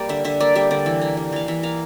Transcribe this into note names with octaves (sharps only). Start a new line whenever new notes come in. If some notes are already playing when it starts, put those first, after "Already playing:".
Already playing: G3 A#3 D5
D3 E5
D3 E5
A#3 D5
G3 E5
D3 D5
E3
A#3
G3
E3 F5
E3 E5
A#3 F5